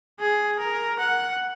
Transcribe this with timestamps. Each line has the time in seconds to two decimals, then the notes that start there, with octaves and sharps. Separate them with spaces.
0.20 G#4
0.59 A#4
0.99 F#5